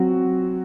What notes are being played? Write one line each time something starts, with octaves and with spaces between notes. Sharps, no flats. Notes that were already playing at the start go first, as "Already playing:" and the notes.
Already playing: F#3 C4 F#4